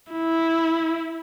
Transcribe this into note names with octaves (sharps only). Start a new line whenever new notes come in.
E4